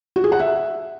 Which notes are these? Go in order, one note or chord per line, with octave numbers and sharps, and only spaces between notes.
F#4
G#4
F#5
E5